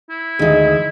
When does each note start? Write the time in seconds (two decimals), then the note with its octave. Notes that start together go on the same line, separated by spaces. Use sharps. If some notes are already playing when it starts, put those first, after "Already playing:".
0.10 E4
0.39 D2 D#3 G#3 D#4 D#5